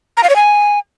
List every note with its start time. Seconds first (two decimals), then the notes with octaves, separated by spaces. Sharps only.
0.17 A#5
0.23 F5
0.30 C#5
0.36 G#5